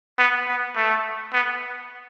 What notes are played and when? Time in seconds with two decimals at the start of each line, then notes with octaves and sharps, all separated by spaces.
0.19 B3
0.47 B3
0.76 A3
1.33 B3